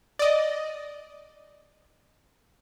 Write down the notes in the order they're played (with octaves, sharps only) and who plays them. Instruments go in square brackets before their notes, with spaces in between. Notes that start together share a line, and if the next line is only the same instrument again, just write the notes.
[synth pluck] D5 D#5